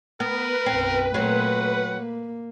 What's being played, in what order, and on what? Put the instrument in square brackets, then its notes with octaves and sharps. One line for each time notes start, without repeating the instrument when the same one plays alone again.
[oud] B3 [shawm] A#4 [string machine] B4
[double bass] B1 F#2 [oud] C4
[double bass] A#2 A3 [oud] F#3 C4 [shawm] F#5
[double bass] A#3